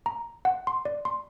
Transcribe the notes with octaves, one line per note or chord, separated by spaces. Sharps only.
A#5
F#5
C6
D5
C6